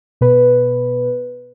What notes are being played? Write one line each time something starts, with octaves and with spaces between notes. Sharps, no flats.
B2 B4